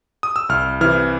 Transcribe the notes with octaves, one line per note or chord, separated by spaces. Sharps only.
D#6
E6
C2 F6
C3 E3 F6